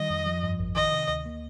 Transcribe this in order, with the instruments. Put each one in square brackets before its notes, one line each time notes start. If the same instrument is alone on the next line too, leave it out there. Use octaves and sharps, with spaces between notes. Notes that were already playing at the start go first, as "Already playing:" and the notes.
Already playing: [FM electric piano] D#3 G3 [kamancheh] D#5
[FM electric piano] F2
F3
G2
A1
[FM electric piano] D#3 [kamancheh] D#5
[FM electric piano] C3
D2
A#3